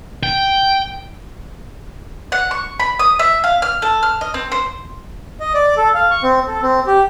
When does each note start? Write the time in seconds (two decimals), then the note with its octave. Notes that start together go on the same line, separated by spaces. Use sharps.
0.23 G5
2.32 F#5
2.51 C#6
2.80 B5
2.99 D#6
3.19 E5
3.44 F5
3.62 F6
3.82 A4
4.03 F6
4.21 D#5
4.34 C4
4.52 C5
5.40 D#5
5.54 D5
5.77 A4
5.94 F5
6.11 C#6
6.23 C4
6.47 A4
6.62 C4
6.87 G4